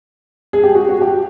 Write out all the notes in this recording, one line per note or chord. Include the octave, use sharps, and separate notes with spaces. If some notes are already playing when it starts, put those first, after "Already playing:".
G#4
G4
F#4
F#4
G4